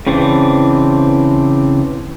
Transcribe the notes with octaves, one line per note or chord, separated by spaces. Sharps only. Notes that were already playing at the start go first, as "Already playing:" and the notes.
C#3 E3 C4 D4